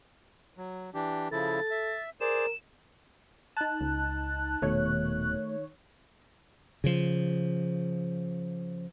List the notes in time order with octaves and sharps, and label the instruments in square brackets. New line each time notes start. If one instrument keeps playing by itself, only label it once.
[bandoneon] F#3
E3 D4 G4
[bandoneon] C#3 F3 E4 [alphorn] A4 [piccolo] A6
[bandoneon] E5
[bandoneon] G#4 C5 D5 [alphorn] A#4 [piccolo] E7
[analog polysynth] D#4 A5 [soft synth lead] F#6
[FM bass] C#2
[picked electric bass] D#1 B2 [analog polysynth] D#3 C#5 [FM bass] A3
[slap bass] C#3 F3